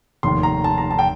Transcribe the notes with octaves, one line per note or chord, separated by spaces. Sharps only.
F1 D#2 D#3 C6
A#5
A5
A#5
A5
G5